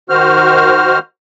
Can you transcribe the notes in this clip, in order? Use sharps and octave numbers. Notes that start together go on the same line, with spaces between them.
D#3 F#4 C5 F6